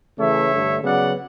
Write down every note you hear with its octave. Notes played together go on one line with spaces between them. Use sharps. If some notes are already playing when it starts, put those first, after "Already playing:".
C#3 E3 A3 C#5 E5
G2 D3 A3
C#3 F#3 B3 D5 F#5